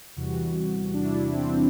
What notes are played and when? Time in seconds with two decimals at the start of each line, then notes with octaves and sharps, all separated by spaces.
0.16 E2 C3 E3 G3 F#4
0.94 D4
1.04 E4
1.33 C4